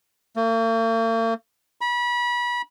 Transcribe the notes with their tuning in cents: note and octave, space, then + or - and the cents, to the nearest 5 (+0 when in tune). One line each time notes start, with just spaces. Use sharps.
A#3 -45
B5 -30